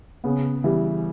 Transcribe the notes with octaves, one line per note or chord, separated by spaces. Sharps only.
C#3 B3
E3 G3